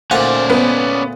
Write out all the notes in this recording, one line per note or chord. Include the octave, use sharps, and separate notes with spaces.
D2 A#2 C#4 C5 D5 F#5
B3